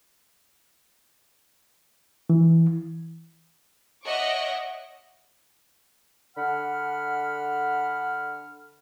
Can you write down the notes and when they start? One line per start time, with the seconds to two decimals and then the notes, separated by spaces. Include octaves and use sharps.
2.30 E3
4.04 C#5 D#5 E5 F#5 C#6 D6
6.36 D3 F#5 B5 F6